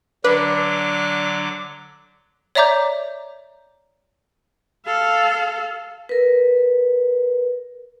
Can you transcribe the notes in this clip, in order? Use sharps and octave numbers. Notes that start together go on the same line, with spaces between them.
D3 F#3 D4 B4 D6
C#5 D5 E5 A#5 D6 G6
A4 F5
A#4 B4